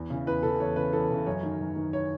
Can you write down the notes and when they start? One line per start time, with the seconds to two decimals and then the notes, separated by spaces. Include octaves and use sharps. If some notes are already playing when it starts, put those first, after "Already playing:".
Already playing: E2
0.10 C#3 E3
0.27 E2 B4
0.43 C#3 E3 A4
0.60 E2 C#5
0.76 C#3 E3 B4
0.93 E2 A4
1.10 C#3 E3
1.26 F#2 C#5
1.43 D#3
1.59 F#2
1.76 D#3
1.93 C#5